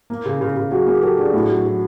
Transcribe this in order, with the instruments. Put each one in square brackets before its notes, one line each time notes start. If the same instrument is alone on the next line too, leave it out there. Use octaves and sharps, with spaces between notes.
[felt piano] A#3
C#3
C#3
C#3
[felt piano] F#3 [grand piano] F#4 G#4
[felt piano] A#3 [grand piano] F#4 G#4
[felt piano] F#3 [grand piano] G4 A4
[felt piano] D4 [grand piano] F#4 G#4
[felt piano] A2 [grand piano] F#4 G#4
[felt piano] F#3
F#3